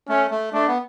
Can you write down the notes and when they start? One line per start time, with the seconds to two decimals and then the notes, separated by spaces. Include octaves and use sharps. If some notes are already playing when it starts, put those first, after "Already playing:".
0.09 A3 C#4
0.31 A3
0.53 A3 D4
0.68 B3